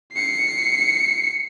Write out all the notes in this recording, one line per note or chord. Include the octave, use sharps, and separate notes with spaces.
C7 C#7